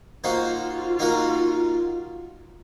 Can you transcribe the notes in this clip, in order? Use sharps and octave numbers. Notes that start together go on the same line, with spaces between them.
A#3 D#4 F4 F#4 C5
F4
A#3 D#4 F#4 A#4